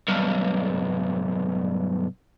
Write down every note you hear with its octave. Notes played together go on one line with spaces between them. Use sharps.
B1 G2